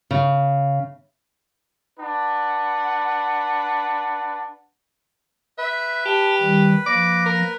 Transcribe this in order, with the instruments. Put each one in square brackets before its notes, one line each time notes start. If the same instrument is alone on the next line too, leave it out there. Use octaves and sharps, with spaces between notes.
[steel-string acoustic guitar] C#3
[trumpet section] D4 B4 F#5
[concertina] B4 [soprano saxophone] E5
[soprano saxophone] G4 [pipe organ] A5
[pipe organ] D#3 G3
[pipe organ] F3 A#3 A#6 [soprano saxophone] D6
[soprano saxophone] A#4